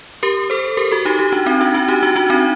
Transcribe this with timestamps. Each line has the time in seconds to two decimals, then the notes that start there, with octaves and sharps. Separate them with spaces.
0.23 G4 A#4
0.50 A4 C5
0.77 G4 A#4
0.91 F#4 A4
1.05 D#4 G4
1.19 D#4 G4
1.32 D4 F#4
1.46 C4 D#4
1.61 D4 F#4
1.74 D4 F#4
1.88 D#4 G4
2.03 D4 F#4
2.16 D4 F#4
2.30 C4 D#4